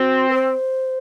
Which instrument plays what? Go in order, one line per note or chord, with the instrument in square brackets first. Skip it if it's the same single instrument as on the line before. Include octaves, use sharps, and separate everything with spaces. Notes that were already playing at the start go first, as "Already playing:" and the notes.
Already playing: [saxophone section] C4 [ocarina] F#4
[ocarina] B4
C5